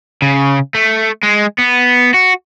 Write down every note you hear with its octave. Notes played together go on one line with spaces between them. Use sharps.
C#3
A3
G#3
B3
F#4